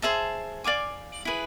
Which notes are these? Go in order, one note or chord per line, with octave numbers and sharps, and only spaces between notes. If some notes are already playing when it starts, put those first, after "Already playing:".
G#4 C5 E5 A5
D5 F5 G#5 D6
E4 G#4 B4